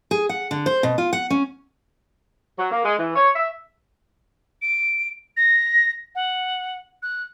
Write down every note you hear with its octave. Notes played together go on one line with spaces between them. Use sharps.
G#4
F#5
D3
C5
B2
F4
F#5
C#4
F#3
A#3
G#3
E3
C#5
E5
D7
A#6
F#5
F#6